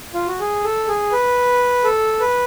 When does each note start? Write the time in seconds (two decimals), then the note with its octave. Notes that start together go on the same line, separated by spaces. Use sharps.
0.14 F4
0.27 F#4
0.40 G#4
0.64 A4
0.88 G#4
1.12 B4
1.84 A4
2.20 B4